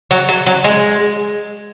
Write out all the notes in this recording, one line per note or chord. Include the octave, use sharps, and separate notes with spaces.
F#3
F#3
F#3
G#3